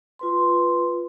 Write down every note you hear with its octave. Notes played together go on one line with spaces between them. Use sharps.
F4 B4 C6